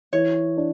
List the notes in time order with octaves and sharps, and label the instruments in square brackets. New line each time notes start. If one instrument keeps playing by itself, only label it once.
[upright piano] E3 [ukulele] C#5
[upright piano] D4